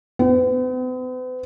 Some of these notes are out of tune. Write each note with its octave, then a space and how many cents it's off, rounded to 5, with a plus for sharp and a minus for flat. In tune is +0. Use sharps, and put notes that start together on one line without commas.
B3 +45